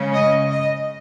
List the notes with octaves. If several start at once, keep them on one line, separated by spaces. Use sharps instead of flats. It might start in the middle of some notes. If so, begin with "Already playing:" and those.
Already playing: C#3 G#3 C#4
D#5
D#5